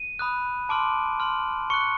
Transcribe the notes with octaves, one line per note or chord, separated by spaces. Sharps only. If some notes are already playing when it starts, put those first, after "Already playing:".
Already playing: D#7
B5 D#6 F#6
A5 C6 D6 F6 D7
C6 F6
C#6 F#6 C#7